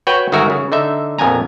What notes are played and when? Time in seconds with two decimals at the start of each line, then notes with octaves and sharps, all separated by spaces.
0.07 F#4 B4 C#5 G5
0.32 G1 D#3 G#3 F#4 A#4 E5
0.50 C#3
0.72 D3 D#4 E5
1.18 A#1 F2 B3 G#5 A#5